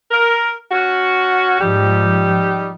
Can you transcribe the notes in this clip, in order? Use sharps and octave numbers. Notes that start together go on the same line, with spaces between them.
A#4
C#4 F#4
G#2 F3 G3 D#4 G4